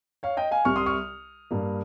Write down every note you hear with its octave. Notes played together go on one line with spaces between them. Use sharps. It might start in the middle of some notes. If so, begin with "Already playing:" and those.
C#5 F5
D#5 G5
F5 G#5
C2 C3 G3 C#6 F6
C6 D#6
C#6 F6
G2 G3 A#3